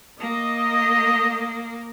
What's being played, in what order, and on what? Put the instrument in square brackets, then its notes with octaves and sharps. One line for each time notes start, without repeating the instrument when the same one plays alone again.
[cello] A#3 [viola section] D#5